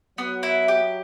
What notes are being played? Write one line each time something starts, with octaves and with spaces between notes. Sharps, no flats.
F#3 B3
E4
G4